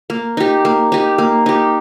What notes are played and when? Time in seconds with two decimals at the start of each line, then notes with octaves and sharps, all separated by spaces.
0.10 A#3
0.37 D#4 G4
0.65 A#3
0.92 D#4 G4
1.18 A#3
1.46 D#4 G4